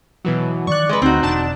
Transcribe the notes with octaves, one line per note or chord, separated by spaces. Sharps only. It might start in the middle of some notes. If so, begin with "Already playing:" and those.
B2 E3 F#3
D#3 E3 F#3 D5 C#6 F#6
G#3 B4
D2 C4 D#4 F#4
E1 D4 A5 E7